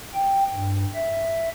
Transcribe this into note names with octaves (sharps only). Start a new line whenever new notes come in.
G5
G2
E5